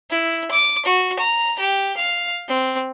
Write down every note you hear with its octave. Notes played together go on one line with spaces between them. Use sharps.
E4
D6
F#4
A#5
G4
F5
C4